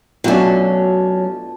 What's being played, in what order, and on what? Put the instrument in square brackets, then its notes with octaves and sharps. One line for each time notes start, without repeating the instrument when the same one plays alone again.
[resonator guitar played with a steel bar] B2 A3 D4 [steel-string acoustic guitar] F#3 C#4 [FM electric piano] F4